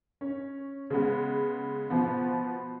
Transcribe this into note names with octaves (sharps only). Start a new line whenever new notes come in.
C#4
C#3 G#3 B3
B2 F3 B3